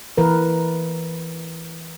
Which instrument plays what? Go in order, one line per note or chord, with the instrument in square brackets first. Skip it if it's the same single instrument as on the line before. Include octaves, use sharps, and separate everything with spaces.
[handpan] E3 A#4 B4